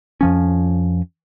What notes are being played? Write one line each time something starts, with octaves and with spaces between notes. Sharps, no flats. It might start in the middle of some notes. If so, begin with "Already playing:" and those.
F2 F3 C#4